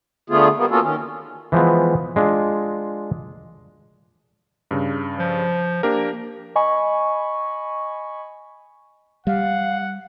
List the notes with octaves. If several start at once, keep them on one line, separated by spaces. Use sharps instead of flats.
D3 A3 B3 F4 G#4
G3 A#3 B3
A#3 B3 C#4 F4 F#4 A4
D#3 C#4
E3 F3 G#3 B3
G#3 D4 F4
G2 C#3
F3
A#3 D4 G4 A#4
D#5 G#5 B5 C#6
G3 F5 F#5